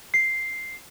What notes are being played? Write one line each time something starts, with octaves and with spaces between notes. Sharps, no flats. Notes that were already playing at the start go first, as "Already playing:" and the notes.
C7